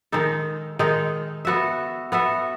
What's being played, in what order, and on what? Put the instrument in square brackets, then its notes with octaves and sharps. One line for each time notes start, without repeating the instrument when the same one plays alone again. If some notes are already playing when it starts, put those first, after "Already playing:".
[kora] D#3 G#3 D#4 A4
D#3 G#3 D#4 A4
B3 F#4 A4 E5
B3 F#4 A4 E5